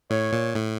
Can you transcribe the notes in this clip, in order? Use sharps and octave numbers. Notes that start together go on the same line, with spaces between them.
A2 C#5
A#2
A2